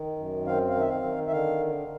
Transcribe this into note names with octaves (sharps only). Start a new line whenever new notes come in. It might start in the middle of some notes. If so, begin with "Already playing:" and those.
Already playing: D#3
F#2
C4 F5
F5
D#3 E5
F5
D#3
E5
D3 F5